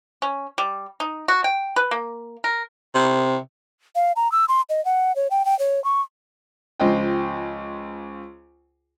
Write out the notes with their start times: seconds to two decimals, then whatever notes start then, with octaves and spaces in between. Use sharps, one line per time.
0.22 C#4
0.58 G3
1.00 D#4
1.28 F#4
1.44 G5
1.76 B4
1.91 A#3
2.44 A#4
2.95 C3
3.96 F5
4.16 A#5
4.32 E6
4.49 C6
4.69 D#5
4.85 F#5
5.16 C#5
5.31 G5
5.45 G5
5.59 C#5
5.84 C#6
6.80 C#2 F3 C5 D#5 G5